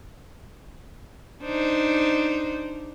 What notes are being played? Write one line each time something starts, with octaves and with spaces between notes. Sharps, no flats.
D4 D#4 C5